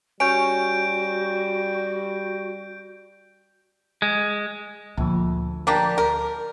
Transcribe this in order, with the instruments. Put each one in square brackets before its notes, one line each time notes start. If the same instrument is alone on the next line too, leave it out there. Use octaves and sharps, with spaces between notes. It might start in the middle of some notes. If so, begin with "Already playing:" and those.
[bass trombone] G3 [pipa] C#4 [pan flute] F#4 [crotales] G6 D7
[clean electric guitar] G#3
[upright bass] D2 [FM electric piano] A#2 D3 F3
[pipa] A#3 D4 G4
A#4